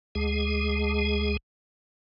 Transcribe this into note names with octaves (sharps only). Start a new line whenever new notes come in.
D2 G#3 G#4